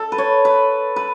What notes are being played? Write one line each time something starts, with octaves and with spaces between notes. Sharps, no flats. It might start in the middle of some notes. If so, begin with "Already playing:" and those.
Already playing: A4
B4
C#5
B4
B4